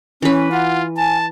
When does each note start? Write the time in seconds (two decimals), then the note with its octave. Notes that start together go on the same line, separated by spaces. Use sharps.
0.22 E3 C#4 B4
0.52 F4 F#5
0.97 G#5 A5